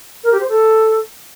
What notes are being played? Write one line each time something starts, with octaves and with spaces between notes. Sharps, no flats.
A#4
G4
C5
A4